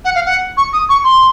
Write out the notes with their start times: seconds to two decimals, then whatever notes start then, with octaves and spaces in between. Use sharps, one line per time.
0.05 F#5
0.15 F5
0.26 F#5
0.57 C#6
0.73 D#6
0.89 C#6
1.04 C6